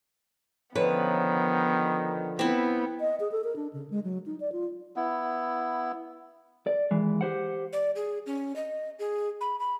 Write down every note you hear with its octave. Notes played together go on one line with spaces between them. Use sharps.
D3 D#3 F3 B3 C#4 B4
B3 C4 E4
D#5
G#4
A4
A#4
D4
C#3
G#3
F#3
D#4
D5
F4
B3 E4
D5
D#2 E3 G#3
G4 C5 F#5
D5
G#4
C#4
D#5
G#4
B5
B5